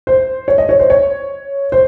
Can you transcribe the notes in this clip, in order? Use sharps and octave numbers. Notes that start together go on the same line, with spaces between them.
C5
C#5
D#5
C#5
C5
C#5
C5